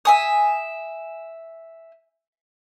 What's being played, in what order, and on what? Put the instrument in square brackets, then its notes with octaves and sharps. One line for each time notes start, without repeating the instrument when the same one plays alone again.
[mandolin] E5 G#5 D#6